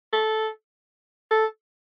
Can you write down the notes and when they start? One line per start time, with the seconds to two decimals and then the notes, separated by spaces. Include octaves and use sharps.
0.13 A4
1.31 A4